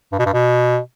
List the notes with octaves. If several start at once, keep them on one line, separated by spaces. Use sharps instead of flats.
G2
B2
G2
B2